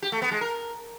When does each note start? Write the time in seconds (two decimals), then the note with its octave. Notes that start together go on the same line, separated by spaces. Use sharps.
0.02 G4
0.12 A3
0.22 B3
0.32 G#3
0.41 A#4